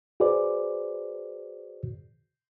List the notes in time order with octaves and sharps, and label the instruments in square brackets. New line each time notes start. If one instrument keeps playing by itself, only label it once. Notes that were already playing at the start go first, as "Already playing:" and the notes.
[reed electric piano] F#4 G#4 B4 C5 D5